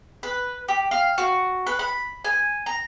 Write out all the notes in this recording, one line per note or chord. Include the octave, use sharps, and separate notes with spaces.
B4
G4
F5
F#4
B4
B5
G#5
A#5